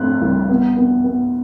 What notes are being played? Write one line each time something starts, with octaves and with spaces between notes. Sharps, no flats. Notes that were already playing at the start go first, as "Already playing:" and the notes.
Already playing: A3 C4 F#6
C2
B3
B3
B3